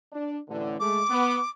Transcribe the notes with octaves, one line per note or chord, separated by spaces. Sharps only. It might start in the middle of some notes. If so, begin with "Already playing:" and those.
D4
A1 D3
G#3 A3 D6
B3